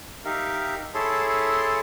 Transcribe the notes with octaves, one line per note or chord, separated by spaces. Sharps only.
D#4 G4 A#4 E5 F5
E4 G#4 A4 C#5 A5 C6